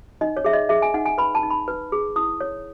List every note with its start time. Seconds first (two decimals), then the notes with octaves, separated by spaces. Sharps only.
0.21 D#4 D#5
0.37 C#5
0.44 G#4 E5
0.53 D#5
0.69 G#4 E5
0.82 G#5
0.94 D#4 F#5
1.06 G#5
1.18 B4 B5
1.35 A5
1.43 D#4
1.50 B5
1.68 B4
1.92 G#4
2.16 E4 D#6
2.41 C#5